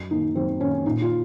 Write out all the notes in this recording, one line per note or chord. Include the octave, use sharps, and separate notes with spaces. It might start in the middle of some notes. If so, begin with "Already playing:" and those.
Already playing: F#2
D#3 A#3 D#4
F#2 C4
D#3 A#3 C#4
A#2 D#4
F4